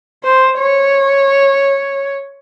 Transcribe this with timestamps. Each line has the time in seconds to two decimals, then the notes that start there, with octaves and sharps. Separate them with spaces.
0.24 C5
0.59 C#5